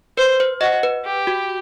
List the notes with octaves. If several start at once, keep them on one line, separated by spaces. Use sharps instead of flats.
B4 C5
C5
F#4 D#5
B4
G4
F#4